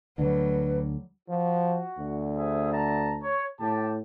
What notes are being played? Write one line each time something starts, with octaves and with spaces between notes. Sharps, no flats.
D2 D3 F#3 G3 B4
F3 F#4
D2
G#4 C5 E5
A5 A#5
C#5
A2 G4 A5